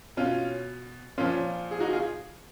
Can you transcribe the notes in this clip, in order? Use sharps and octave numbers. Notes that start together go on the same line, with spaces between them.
B2 C#4 F4
A#2 F3 C#4 F4
G#4
D#4 F#4
F4 G#4